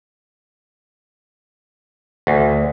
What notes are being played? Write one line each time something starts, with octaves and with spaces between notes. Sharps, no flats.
D2